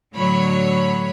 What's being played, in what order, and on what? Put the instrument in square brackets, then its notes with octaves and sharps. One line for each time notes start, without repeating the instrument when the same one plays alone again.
[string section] A2 D3 F#3 C#5 B5